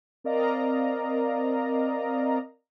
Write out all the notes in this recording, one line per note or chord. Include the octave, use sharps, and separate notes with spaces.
C4 A#4 D5 D#5 F5 A#5